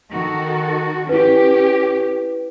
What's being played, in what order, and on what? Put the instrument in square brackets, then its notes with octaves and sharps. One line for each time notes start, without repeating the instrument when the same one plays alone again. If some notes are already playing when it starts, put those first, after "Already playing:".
[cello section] D#3 F#4 A4
[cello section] C#4 G4 [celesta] E4 B4